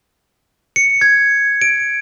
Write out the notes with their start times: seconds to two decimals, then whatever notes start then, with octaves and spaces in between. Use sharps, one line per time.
0.76 C#7
1.01 G#6
1.62 D7